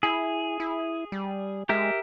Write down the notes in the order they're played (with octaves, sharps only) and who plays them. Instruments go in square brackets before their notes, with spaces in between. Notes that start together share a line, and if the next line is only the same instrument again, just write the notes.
[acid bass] E4 [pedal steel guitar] G#4
[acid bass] E4
G3
[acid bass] G#3 [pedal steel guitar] G4 A#4 E5